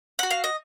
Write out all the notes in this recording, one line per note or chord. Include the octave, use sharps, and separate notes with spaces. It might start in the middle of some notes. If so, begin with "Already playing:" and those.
F#4 F#5
F5
D#5